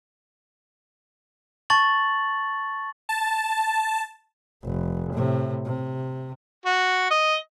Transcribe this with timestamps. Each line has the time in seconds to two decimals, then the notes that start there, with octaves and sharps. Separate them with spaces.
1.70 A5 C#6 A6 F#7
3.09 A5
4.63 F1
5.13 A2 C3
5.65 C3
6.65 F#4
7.11 D#5